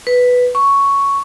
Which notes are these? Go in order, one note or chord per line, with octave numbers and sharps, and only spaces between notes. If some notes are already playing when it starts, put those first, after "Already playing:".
B4
C#6